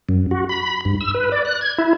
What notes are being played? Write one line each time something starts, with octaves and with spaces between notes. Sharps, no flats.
F#2
F#4
B5
G2
E6
B4
D5
F#6
G#6
E4